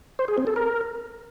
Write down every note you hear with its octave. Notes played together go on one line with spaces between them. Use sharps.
C5
G#4
C4
A4
A#4